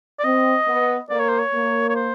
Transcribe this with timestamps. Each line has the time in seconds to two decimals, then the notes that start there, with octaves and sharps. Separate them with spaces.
0.19 D5
0.24 C4 D#5
0.66 B3
1.10 A#3 D5
1.19 C#5
1.29 C5
1.39 C#5
1.53 A#3
1.89 C#5
1.96 C5